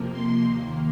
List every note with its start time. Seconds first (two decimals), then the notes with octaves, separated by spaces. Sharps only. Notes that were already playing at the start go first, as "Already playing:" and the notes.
Already playing: F2 C3 F3 A#3
0.12 C6
0.45 D#2 D#3 A#3